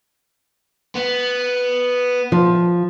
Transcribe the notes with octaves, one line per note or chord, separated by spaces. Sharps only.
B3
F3